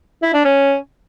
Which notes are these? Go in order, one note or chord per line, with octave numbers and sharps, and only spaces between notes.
E4
D4
C#4